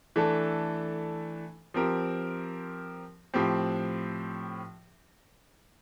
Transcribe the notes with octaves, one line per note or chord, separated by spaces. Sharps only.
E3 A3 D4 A4
F3 C4 G4 A#4
A2 F3 C4 G4